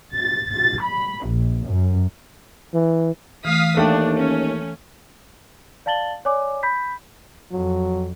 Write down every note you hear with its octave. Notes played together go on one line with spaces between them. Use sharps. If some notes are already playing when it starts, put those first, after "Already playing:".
A6
A6
B5
A#1
F#2
E3
E3 A3 F5 D#6 B6
D#2 A3 D4 F5 G5
C#4
D5 F5 A5 A6 F#7 G7
C#5 D5 G#5 D6
B5 G6 B6
F2 F#3